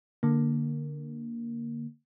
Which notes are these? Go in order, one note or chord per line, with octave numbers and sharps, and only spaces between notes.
D3 A#3